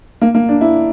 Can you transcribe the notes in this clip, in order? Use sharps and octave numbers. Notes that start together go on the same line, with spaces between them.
A#3
A#3
D4
E4